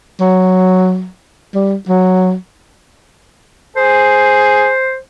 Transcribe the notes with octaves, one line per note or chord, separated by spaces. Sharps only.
F#3
G3
F#3
G#4 C5